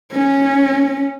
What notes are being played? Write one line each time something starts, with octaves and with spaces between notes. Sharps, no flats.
C#4